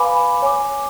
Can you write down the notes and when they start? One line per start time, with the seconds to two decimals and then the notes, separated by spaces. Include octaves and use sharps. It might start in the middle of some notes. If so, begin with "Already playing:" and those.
Already playing: B4 F5 G#5 B5 D6
0.42 C#5 G#5 D6